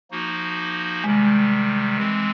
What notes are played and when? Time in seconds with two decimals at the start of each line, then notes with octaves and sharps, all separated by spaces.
0.11 F3 A#3 D#4 F#4
1.04 C3 D#3 G3 G#3
1.97 E3 G#3 C4